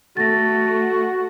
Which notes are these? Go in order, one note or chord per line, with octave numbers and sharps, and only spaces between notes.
A3 F#4 A6 A#6